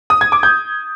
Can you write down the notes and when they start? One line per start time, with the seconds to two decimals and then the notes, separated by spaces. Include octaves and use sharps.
0.10 D#6
0.21 G#6
0.32 D6
0.43 G6